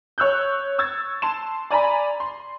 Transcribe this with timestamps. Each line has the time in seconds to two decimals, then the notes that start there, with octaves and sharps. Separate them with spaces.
0.18 C#5 E6 F#6 G6
0.78 C#6 E6 G#6 A6
1.22 A5 C6 E7
1.71 D5 G#5 A#5 B5
2.20 C6